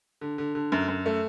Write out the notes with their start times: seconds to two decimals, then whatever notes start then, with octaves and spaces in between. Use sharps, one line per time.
0.21 D3
0.38 D3
0.55 D3
0.72 F#2
0.88 F#2
1.06 A3